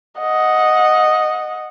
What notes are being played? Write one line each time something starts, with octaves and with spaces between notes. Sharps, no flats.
D#5 F#5